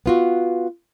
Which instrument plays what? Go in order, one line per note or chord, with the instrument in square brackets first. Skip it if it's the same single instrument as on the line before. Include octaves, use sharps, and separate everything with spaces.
[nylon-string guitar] B3 F4 F#4